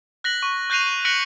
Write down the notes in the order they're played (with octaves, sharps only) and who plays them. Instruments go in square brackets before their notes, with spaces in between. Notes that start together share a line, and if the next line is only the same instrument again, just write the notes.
[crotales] F#6 A#6 B6 F#7
C#6
F#6 G6 A#6 C7 D#7 F7
F#6 A#6 B6 C#7 D7 F#7